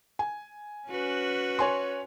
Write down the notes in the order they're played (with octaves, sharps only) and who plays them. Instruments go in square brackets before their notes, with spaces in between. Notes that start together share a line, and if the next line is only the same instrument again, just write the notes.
[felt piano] G#5
[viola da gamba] C#4 F#4 B4
[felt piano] C#5 G#5 C6